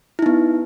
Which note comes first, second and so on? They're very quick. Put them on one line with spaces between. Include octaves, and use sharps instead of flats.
E4 D#4 B3